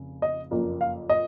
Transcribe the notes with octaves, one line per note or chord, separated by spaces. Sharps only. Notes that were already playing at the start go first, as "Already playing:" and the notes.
Already playing: F1 C#3
D#5
F#1 F2 F3 A#3
F5
D#5